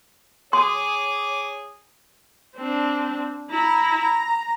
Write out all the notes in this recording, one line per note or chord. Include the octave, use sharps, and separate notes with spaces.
G#4 C#5 C6 D6
C4 D4
E4 A#5
A#5